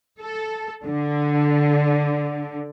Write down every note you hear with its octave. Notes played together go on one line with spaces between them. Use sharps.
A4
D3